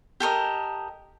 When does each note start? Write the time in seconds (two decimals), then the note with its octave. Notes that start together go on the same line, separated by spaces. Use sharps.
0.20 G4 A4 A#4 D#5